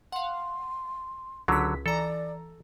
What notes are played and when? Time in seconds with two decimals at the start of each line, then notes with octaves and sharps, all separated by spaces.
0.12 F5 F#5 C6
1.48 C#2 D3 F#3 B6
1.86 E3 A4 D5 A#5